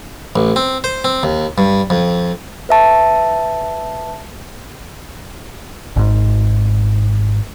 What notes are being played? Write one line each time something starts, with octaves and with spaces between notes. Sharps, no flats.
A1
C4
C5
C4
D#2
G2
F2
B4 E5 A5
G#1 G#2